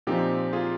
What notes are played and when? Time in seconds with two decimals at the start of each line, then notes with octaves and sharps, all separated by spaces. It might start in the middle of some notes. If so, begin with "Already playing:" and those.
0.07 A#2 F3 C4 D#4 G4
0.53 F4 G#4